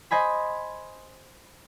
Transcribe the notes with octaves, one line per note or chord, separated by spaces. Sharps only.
C5 D#5 G#5 B5